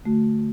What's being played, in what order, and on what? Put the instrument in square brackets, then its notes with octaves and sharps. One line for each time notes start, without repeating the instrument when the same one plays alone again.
[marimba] D3 A3 F#4